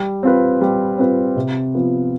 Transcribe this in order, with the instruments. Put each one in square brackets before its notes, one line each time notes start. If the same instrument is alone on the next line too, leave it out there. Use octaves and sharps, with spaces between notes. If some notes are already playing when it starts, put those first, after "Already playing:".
Already playing: [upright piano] G3
C4 F4 B4
G3
C4 F4 B4
C3
F3 B3 F4